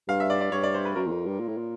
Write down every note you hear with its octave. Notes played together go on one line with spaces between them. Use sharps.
G2 F5
E5
D5
D5
G2 C#5
D5
C5
B4
F#2 A#4
E2
F2
G2
A#2
A2
A#2